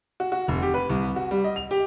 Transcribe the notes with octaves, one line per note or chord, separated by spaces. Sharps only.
F#4
F#4
F1
G4
B4
C2
F#4
G3
D#5
F7
G4